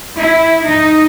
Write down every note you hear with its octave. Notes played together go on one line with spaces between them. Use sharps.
E4
D#4